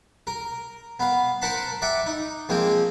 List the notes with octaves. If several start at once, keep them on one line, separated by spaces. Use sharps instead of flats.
A#4
B3 F5
A#4 C5 F#5 A5 B5 C6
D5 E5 F#5 G5
D#4
F3 G#3 A#3 C4